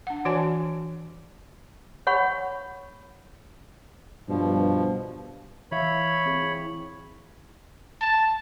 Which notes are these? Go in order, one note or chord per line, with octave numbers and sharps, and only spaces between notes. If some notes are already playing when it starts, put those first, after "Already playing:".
D4 F#5
E3 F#4 C#5 D5 G#5 A5
C#5 F#5 B5 C#6
G2 B2 F3
E3 C#5 E5 F5 B5
C4 G#4
E4
A5